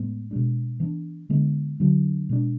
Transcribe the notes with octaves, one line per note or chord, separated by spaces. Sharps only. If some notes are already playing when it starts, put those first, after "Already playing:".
Already playing: A2 G#3 B3
B2 G#3 D4
E3 B3 D4
D3 G#3 B3
D3 F#3 B3 D4
B2 G#3 D4